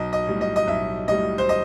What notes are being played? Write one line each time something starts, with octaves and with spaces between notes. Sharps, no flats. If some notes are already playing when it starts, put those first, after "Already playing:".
Already playing: B1 D#5
D#5
A2 G3
D#5
D#5
B1 E5
A2 G3 D#5
C5
D#5